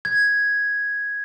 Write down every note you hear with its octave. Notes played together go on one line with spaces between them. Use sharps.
G#6